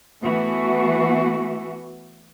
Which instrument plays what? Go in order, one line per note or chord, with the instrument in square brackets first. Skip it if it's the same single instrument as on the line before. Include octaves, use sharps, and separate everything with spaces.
[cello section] E3 A3 B3 F#4